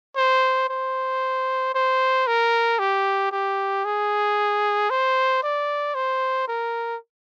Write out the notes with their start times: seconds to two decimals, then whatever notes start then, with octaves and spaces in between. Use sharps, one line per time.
0.16 C5
0.69 C5
1.75 C5
2.27 A#4
2.79 G4
3.32 G4
3.85 G#4
4.90 C5
5.43 D5
5.95 C5
6.48 A#4